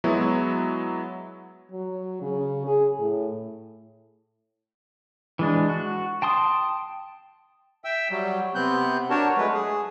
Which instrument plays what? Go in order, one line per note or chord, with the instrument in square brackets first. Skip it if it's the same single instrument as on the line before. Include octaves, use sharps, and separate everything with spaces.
[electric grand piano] F#3 G#3 B3 E4 F#4
[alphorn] F#3
C#3
G#4
A2
[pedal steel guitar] E3 G#3 D4
F#4
G5 A5 C6 D#6
[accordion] E5 G5 E6
F#3 G3
C3 B3 C4 F#6 G6
D4 F#4 A#4 C#5 A5
F#3 G#3 A3 B4
G#4